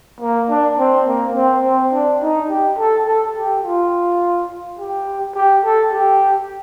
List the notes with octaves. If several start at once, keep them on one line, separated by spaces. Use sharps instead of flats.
A#3
D4
C4
A#3
C4
C4
D4
D#4
G4
A4
A4
G4
F4
G4
G4
A4
G4